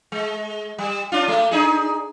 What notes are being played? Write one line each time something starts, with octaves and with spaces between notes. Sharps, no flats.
G#3
G3
C#4 D4 F4
G#3 A3
D4 D#4 G#4